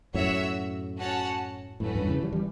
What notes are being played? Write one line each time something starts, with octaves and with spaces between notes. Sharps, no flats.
F#2 A2 F#4 C#5 E5
C#4 F#4 C#5 F#5 A5
F#2 A2 A3 C#4 F#4 B4
E2 G2
C#3 E3
E3 G3
E3 G3